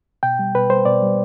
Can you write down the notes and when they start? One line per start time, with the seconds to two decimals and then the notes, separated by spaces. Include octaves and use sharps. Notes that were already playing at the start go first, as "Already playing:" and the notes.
0.23 B2 G5
0.39 G3
0.55 B2 B4
0.70 G3 C5
0.85 B2 D5
1.02 G3